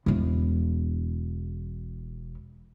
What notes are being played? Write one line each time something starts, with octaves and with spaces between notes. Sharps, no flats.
E1 E2